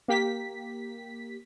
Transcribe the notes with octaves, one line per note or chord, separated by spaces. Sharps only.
A#3 G4 B6